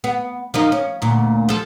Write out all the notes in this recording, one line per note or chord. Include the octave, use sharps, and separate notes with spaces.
B3
F3 A#3 D#4
C#4
D2 A#2
F3 A4